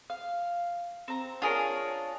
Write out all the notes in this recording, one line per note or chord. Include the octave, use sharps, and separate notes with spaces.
F5
C4 A#5
D4 F4 G#4 A#4 C#5